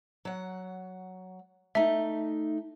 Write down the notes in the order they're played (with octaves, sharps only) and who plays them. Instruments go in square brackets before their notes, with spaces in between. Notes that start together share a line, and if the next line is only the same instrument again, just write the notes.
[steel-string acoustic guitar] F#3 F#5
[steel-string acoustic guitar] A3 D#4 [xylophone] E5